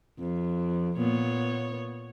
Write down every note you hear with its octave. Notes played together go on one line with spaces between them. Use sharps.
F2
A#2 B3 C#5